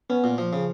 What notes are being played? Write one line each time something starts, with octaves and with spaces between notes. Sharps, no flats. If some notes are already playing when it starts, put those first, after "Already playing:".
B3 C#4
A#2
F3
C#3